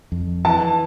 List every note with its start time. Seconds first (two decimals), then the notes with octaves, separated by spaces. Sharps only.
0.12 F2
0.45 E3 A5